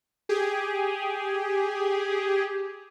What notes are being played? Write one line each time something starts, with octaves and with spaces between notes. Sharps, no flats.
G4 G#4